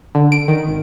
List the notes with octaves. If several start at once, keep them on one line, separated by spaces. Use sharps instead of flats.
D3
D7
D#3
G#1